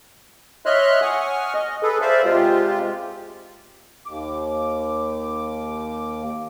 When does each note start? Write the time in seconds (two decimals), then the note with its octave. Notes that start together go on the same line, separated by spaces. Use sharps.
0.66 C#5 D#5 E5 C6 F6 F#6
1.02 F#5 G#5 C#6 D#6 F6
1.54 D#5
1.83 G#4 A4 B4
2.01 C5 D5 E5 F5
2.25 C3 G#3 F4 G4
4.06 D#2 D6